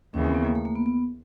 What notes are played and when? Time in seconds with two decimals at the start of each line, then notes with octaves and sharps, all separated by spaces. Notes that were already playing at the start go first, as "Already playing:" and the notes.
0.14 D#2 C#3 E3 C#4
0.24 C4
0.34 B3
0.45 A#3
0.55 A3
0.65 A#3
0.75 B3
0.86 B3